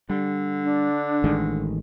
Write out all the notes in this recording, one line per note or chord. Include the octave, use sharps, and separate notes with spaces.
D3 G3
D4
A1 D#3 G#3